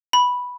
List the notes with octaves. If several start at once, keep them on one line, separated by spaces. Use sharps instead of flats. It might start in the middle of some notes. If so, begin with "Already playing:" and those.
B5